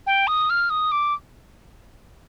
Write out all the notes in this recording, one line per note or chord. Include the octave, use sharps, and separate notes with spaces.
G5
D#6
F6
D#6
D6